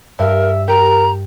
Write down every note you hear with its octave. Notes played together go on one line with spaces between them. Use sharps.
G2 A#4 E5
G4 A#4 A#5 D7